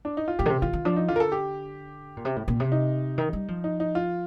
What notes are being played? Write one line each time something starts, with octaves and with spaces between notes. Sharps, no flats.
D4
D#4
F4
A2 G4
D3
C3
D#3 F4
D#3
F3 D4
D#4
D3 F4
A#4
A4
G4
A#2
C3
A2
A#2
C3
D#4
D#3
G3
F3
D#4
D#4
F4